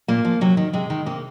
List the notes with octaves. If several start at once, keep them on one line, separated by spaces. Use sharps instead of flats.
A#2 A#3
F3
C3 F#3
D#3
C3 G#3
D#3
C3 A#3